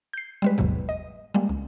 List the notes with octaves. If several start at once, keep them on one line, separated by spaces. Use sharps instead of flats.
G6 C7
G3 G#3 B4
G1 D#2 G#2 B2 F#3
D#5
G3 G#3 A#3
C#2